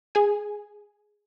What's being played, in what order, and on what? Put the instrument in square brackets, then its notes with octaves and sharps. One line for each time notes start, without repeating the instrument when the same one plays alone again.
[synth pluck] G#4 G#5